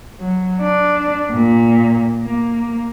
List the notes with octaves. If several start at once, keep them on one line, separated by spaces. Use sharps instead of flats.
F#3
D4
A#2
A#3